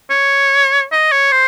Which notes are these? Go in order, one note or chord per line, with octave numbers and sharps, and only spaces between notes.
C#5
D#5
C#5
C5